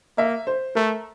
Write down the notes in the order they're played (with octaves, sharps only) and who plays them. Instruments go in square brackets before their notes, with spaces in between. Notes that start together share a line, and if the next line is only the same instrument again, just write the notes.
[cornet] A#3 [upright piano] E5
[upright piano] C5
[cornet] A3 [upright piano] A#4